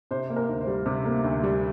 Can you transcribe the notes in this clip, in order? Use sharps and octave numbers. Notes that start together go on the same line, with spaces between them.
C3 C5
A#3
A#4
D2
C5
G3
C3
A#3
D2
G3